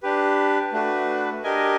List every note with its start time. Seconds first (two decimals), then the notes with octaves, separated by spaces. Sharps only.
0.02 D4 G4 B4
0.72 A3 D4 F#4 B4
1.44 D4 G4 A#4 D#5 G#5